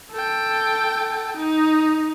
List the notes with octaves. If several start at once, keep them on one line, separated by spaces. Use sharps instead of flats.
A4 G5
D#4